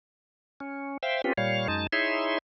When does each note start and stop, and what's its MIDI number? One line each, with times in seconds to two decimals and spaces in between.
0.60 0.97 61
1.03 1.21 72
1.03 1.21 76
1.03 1.21 77
1.03 1.21 79
1.24 1.33 60
1.24 1.33 61
1.24 1.33 65
1.24 1.33 67
1.24 1.33 71
1.37 1.68 46
1.37 1.68 55
1.37 1.68 73
1.37 1.68 77
1.68 1.87 42
1.68 1.87 56
1.68 1.87 63
1.68 1.87 81
1.93 2.38 63
1.93 2.38 64
1.93 2.38 68
1.93 2.38 73
1.93 2.38 76
1.93 2.38 84